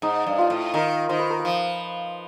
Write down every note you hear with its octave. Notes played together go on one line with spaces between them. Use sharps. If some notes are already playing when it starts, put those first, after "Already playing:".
G#2 D#4
G2
F4
A2
D#3 A#4
D#3 C5
B4
A#4
B4
F3